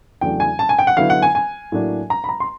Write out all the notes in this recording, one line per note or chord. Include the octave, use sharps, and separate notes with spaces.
E2 C#3 F#3 A3 D4 G5
G#5
A5
G#5
G5
F#5
D3 F#3 B3 E4 F5
F#5
G#5
G#5
A2 F#3 A#3 D4
A#5
B5
A#5
C6